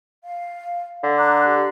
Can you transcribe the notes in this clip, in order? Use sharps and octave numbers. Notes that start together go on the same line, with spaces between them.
F5
D3
A#5 D6 F#6
G4